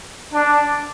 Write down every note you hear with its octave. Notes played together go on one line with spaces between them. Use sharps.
D4